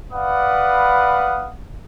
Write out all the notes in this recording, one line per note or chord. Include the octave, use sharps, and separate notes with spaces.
B4 D5 F5 F#5 B5 D#6